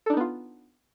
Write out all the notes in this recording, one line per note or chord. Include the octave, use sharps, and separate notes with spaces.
B3 D4 D#4 F4 A4